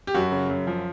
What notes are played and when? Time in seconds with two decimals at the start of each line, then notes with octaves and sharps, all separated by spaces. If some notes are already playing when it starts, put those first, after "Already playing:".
0.07 G4
0.14 F#2 F#4
0.32 C#3
0.50 F#2
0.67 F3